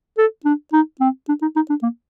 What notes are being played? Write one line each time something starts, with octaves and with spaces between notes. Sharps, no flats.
A4
D4
D#4
C4
D4
D#4
D#4
D4
A#3